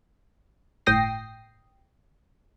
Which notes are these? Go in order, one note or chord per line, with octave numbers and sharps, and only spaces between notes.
G1 A2 G5 D#6 A#6 C7